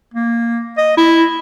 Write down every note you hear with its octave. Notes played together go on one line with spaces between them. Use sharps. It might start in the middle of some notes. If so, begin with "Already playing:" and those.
A#3
D#5
E4